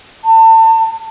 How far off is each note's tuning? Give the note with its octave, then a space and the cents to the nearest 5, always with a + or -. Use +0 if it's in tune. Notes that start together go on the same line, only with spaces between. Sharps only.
A5 +35